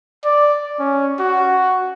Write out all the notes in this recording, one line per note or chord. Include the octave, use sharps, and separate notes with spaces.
D5
C#4
F#4